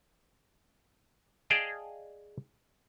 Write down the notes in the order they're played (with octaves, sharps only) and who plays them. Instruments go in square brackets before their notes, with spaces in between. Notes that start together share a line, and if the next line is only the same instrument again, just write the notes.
[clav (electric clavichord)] G#4 D5 D#5 F5 G5 A5